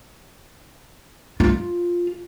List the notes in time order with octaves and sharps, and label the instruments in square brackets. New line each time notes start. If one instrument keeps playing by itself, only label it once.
[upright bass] F4